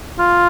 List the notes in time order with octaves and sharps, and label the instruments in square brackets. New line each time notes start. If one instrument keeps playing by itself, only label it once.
[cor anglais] F4